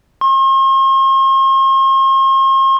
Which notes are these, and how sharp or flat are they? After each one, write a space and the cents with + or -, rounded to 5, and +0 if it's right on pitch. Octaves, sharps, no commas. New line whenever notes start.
C6 +45